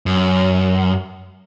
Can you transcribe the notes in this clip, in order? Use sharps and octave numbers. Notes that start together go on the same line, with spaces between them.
F#2